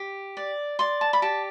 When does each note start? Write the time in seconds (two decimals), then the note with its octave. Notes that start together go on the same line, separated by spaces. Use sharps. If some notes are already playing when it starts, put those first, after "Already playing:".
Already playing: G4
0.37 D5
0.79 D5 C6
1.01 A5
1.13 B5
1.22 G4 A5